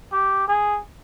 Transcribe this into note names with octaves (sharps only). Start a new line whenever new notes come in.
G4
G#4